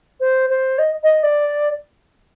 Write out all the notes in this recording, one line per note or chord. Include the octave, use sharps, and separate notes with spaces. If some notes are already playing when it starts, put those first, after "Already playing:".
C5
C5
D#5
D#5
D5